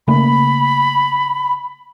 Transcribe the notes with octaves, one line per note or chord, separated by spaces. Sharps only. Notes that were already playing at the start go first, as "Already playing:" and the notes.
C#3 A3 A#3 B5